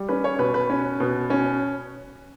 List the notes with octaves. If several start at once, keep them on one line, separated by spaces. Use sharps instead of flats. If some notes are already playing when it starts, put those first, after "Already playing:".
Already playing: G3
C#4 B4
C#5
B2 B4
B4
C#4
B2
C#4